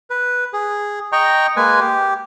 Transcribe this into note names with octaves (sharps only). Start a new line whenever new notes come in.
B4
G#4
D#5 G5 A#5 C#6
G#3 A#3 B4 G#5
G4